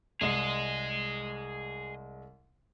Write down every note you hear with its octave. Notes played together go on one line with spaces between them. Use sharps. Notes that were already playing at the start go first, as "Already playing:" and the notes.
C2 G#3 G#4 D#5 C7